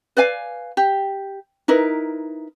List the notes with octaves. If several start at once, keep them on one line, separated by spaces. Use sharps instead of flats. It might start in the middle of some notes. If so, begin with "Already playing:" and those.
B4 D5 F5 G#5
G4
D#4 E4 A#4 B4